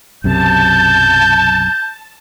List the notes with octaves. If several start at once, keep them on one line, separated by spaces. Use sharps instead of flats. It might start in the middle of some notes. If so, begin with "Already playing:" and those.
B1 F#2 C3 A5 G6